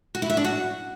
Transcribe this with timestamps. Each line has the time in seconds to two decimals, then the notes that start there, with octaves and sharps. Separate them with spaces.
0.15 F#4
0.22 E4
0.30 E5
0.37 D4
0.44 F#4